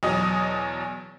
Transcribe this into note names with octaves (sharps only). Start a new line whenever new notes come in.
E2 B2 F#3 D#5